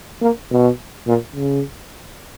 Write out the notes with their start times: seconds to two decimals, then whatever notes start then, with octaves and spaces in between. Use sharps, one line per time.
0.21 A#3
0.51 B2
1.07 A#2
1.35 C#3